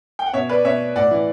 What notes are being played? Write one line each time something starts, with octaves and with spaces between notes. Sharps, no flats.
G5
F#5
B2 C#5 E5
B4 D5
B2 C#5 E5
A2 D5 F#5
E3